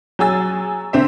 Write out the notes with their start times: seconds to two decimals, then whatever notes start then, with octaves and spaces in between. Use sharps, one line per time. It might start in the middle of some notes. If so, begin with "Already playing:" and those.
0.19 F#3 G#4 G#5 E6 A6
0.93 D3 C4 E5